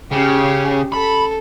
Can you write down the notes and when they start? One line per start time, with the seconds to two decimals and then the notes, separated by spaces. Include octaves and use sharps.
0.11 C#3 C#4 G4
0.92 A4 B5